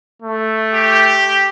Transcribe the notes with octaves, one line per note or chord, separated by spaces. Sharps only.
A3
G4